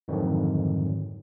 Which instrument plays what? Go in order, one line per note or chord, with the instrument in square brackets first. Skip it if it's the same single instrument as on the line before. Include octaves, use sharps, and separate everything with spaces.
[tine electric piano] F2 G#2 D3 D#3 F#3